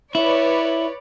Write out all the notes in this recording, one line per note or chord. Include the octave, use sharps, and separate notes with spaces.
E4 B4 C#5 D5